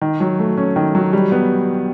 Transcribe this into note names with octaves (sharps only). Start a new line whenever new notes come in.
D#3
F#3
A3
C#4
D#3
F#3
G3
B3